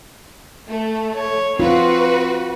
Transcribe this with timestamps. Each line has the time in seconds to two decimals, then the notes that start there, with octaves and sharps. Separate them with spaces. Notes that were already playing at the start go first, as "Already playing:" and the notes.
0.68 A3
1.15 C#5
1.60 C4 F4 F#4 B4